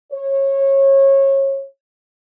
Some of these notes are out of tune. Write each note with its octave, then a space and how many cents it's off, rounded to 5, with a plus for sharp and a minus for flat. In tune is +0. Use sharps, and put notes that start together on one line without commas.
C#5 -25